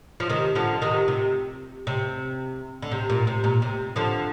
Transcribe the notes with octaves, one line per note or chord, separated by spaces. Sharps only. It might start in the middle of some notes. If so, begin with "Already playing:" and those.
F3
C3 D#3
D3 F3
C3 D#3
C3
C3
D3
C3
A#2
C3
A#2
C3
D3 F3